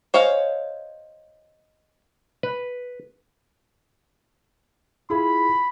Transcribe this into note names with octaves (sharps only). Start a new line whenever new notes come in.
C5 C#5 D#5 F5 G#5
B4
E4 F4 G#4 B5